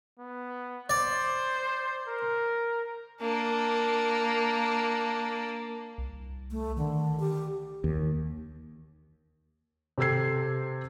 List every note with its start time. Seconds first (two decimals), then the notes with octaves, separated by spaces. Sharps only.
0.19 B3
0.90 C5 D5
2.08 A#4
3.21 A#3 D4
5.98 C2
6.51 A3
6.77 D3 D#3
7.20 G4
7.84 D#2
9.98 C3 G4 A4 E6 G#6 C7